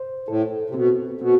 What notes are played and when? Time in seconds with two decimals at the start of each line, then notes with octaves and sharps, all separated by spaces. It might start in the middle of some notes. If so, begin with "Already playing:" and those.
Already playing: C5
0.28 A2 A4
0.70 C3
0.74 B2 C4
1.21 B2 C4